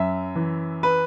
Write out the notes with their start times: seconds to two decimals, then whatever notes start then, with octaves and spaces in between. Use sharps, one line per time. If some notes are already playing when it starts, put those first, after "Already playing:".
Already playing: F#2 E5
0.35 E3
0.83 B4